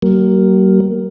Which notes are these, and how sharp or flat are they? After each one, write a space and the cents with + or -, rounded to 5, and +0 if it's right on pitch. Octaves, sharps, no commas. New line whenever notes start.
F#3 +45 A#3 +0